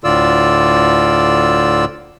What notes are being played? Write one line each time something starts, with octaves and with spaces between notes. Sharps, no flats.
D2 A2 D3 F4 D5 E6